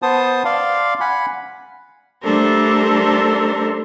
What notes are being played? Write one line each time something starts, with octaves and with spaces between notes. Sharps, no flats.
B3 C5 A5 D#6
D5 F5 C6
F#5 G#5 B5
G3 A3 D4 A4 A#4 C5